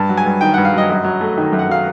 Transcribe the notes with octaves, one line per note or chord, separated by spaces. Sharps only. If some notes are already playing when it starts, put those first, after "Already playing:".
Already playing: G2 A5
F#3
G#5
G2
D#3 G5
G2 F#5
F5
F#3 D#5
F#2
F#3
A3
D#3
F#2
F#5
F#3 F5